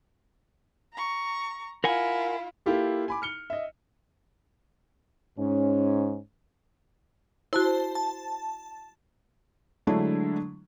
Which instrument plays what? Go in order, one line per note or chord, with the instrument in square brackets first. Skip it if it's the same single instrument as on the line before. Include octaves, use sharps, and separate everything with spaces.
[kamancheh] A#5 C#6
[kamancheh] E4 F4 [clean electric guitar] A#4 F#5 G#5
[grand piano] A#3 E4 F4 G4 A4
G#5 B5 D6
F6 C#7 G7
D#5 E5
[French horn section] G#2 C#4
[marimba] E4 F#4 [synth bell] C5 A5
[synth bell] A5
[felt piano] D3 F#3 G#3 A3 D4 E4